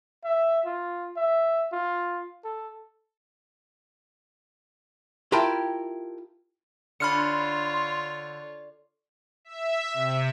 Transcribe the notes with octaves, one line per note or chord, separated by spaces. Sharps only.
E5
F4
E5
F4
A4
E4 F4 G4 A#4 G5 A5
D3 F4 C#5 B5 C6 F6 C#7
E5
C3